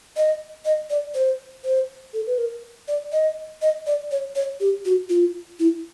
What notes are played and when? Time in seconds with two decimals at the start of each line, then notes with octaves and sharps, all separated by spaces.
0.16 D#5
0.65 D#5
0.90 D5
1.15 C5
1.64 C5
2.14 A4
2.27 B4
2.38 A#4
2.88 D5
3.12 D#5
3.62 D#5
3.87 D5
4.11 C#5
4.35 C#5
4.60 G4
4.85 F#4
5.09 F4
5.60 E4